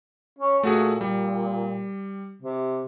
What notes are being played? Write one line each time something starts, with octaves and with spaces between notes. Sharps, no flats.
C#4
A#2 A3 F#4 G#4
G3
C3